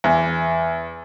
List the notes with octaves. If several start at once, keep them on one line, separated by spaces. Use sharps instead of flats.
E2